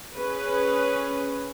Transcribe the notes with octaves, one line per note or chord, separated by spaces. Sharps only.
C#4 G#4 B4